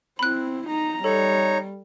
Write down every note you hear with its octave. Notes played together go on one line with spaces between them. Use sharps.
C4 E4 B5 F#6
D#4 A#5
G3 D#4 A4 C#5 A#5